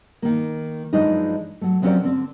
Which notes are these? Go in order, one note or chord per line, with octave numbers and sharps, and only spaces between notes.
D#3 A#3
F#2 E3 F3 G#3 D4 D#4
F#3 A3
F3 F#3 C4 C#4 A#4 D5
D3 C4